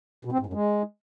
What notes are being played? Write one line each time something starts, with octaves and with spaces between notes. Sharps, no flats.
B2
C4
G#2
F#2
G#3